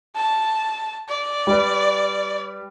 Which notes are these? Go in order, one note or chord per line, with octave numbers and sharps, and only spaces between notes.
A5
D5
G3 B4